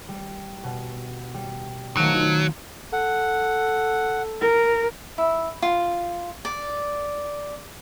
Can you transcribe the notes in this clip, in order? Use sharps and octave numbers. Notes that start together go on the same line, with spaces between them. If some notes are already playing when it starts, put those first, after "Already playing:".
G3
B2
G3
D#3 F3 F#3 A3
D#4 F4
A4 F#5
A#4
E4
F4
D5